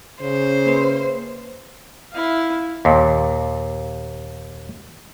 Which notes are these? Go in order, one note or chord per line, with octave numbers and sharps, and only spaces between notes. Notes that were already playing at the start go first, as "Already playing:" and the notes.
C#3 C5
A#3 B4
E4 F5
D#2 A#2